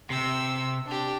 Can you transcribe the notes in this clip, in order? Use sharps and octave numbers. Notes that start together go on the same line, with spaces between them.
C3 G5 E6
D4 G4